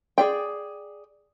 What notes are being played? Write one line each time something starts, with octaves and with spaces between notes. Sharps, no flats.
G#4 D5 G5